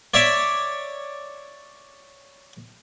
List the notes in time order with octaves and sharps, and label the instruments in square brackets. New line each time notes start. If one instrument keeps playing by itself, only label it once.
[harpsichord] C#5 D5 E5